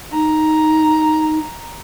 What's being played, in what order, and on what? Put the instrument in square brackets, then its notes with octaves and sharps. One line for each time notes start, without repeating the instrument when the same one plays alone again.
[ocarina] D#4 [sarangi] A#5